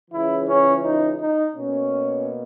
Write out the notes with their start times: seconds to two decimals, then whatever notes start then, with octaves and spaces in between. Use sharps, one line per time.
0.10 C#2 C#3 E3 E4
0.47 C#4
0.83 D#4
1.19 D#4
1.55 B2 A#3 C#4